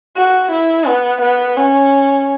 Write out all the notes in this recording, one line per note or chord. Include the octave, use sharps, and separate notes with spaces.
F#4
E4
B3
B3
C#4